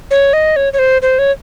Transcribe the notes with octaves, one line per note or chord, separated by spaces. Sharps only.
C#5
D#5
C#5
C#5
C5
C5
C#5